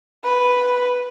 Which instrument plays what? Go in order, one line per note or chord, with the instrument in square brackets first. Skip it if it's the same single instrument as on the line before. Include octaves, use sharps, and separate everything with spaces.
[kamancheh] B4